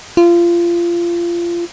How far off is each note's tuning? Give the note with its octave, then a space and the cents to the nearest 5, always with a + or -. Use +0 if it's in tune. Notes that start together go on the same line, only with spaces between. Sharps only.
F4 -25